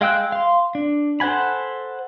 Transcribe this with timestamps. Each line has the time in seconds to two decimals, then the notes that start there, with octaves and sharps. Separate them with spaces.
0.01 G#3 F5 G5 E6 F#6
0.32 F5 C6
0.75 D4
1.20 A4 C5 F#5 G#5 B5